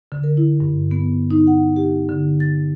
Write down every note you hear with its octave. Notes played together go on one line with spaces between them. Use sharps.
D3
A#4
E4
G2
B3
D#4
F#5
G4
D3
A6